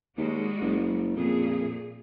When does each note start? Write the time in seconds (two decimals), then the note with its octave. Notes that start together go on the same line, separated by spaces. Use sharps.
0.18 D#2 G3 G#3 F#4
0.61 F#1
1.17 F2 A#2 G#4